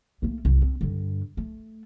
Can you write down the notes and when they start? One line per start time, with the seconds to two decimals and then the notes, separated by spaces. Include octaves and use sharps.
0.22 A3 A#3
0.45 C2 F#2
0.62 C4
0.81 G2 D3
1.37 A3